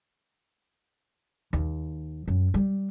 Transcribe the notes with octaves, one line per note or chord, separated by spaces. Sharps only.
D#2
F#2
G3